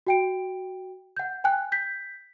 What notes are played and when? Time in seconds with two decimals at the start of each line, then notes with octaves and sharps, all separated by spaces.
0.07 F#4 G5 D7
1.17 F#5 G6
1.44 G5 G#5 F#6
1.72 G6 B6